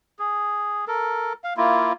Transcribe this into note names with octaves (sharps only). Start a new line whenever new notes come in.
G#4
A4 A#4
F5
A#3 E4 F4